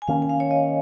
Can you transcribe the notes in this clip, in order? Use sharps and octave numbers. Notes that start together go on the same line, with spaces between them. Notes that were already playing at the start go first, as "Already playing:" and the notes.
G#5
D#3 A#3 C#4 F5
G#5
F5
C#5
D#5